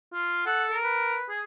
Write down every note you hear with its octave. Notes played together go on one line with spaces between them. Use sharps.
F4
A4 F#5
A#4
B4
G#4